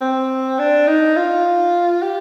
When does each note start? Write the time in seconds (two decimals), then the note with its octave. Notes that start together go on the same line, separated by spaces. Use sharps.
0.01 C4
0.59 D4
0.87 D#4
1.17 F4
2.02 G4